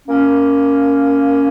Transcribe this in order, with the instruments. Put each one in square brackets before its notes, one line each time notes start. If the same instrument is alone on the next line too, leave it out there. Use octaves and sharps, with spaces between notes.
[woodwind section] A#3 C#4